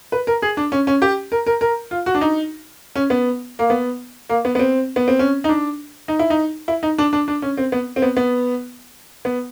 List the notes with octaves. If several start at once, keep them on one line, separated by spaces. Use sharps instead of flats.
B4
A#4
G#4
D4
C#4
C#4
G4
A#4
A#4
A#4
F4
F#4
D4
D#4
C#4
B3
A#3
B3
A#3
B3
B3
C4
B3
C4
C#4
D#4
D4
D#4
E4
D#4
E4
D#4
D4
D4
D4
C#4
C4
B3
C4
B3
B3
B3